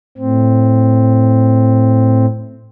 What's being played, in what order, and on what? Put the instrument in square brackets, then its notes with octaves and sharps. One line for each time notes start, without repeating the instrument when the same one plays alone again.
[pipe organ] A2 C4